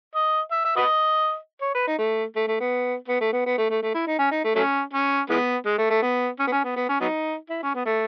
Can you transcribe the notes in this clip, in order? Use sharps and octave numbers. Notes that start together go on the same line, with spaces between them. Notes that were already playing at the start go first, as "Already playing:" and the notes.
D#5
E5
E5
F#4 B4 D#5
C#5
B4
D#4
A3
A3
A3
B3
B3
A3
B3
B3
A3
A3
A3
E4
D#4
C#4
D#4
A3
F#3 A3 C#4
C#4
E3 G#3 B3
G#3
A3
A3
B3
C#4
B3
C#4
B3
B3
C#4
F#3 B3 D#4
E4
C#4
B3
A3